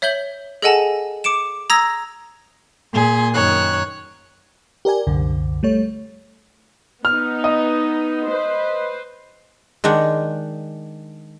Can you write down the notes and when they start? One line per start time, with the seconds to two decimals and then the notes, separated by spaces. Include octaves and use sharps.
0.02 C#5 E5 G6 F#7 G7
0.62 G#4 A4 D#5 F#5 G#5 A5
1.24 D6 C#7 D7 E7
1.70 A#5 D#6 E6 G#6 A#6
2.92 A#2 G#4 C6
3.34 F#2 D#3 C#5 F#6
4.85 G4 A#4 D5 G#5
5.07 C2 F#2 D3
5.63 G3 A3 C#5
7.05 B3 D#4 F6
7.44 D#5
8.30 B4 C5
9.84 D#3 G#3 D4 F#5